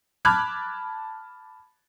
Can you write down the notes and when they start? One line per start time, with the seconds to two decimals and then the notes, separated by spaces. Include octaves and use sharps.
0.25 A5 B5 D6 F6 F#6 G#6